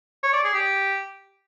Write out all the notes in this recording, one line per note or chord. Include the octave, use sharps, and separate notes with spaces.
C#5
D5
G#4
G4